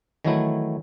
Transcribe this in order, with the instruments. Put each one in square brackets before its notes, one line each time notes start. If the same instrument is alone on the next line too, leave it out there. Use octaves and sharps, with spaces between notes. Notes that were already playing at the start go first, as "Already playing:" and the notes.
[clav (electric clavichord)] D#3 E3 F#3 A3 E4